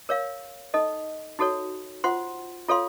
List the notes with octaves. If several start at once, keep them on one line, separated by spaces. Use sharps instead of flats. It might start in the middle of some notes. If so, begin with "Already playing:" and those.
A#4 C#5 F5
D#4 A4 D#5
D#4 F#4 A4 C#5
F4 C5 F#5 C6
F4 A4 C#5 F5 C6